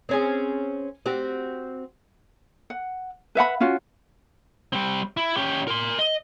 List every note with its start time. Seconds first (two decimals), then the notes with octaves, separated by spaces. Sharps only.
0.09 C4 C#4 G#4
1.06 C4 F#4 G4
2.70 F#5
3.35 B4 E5 F#5 B5
3.60 C#4 F4 F#4
4.73 G3 C4
5.17 E4
5.37 C#4 G4
5.68 A#4 C6
5.99 D#5